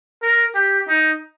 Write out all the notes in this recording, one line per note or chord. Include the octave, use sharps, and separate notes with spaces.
A#4
G4
D#4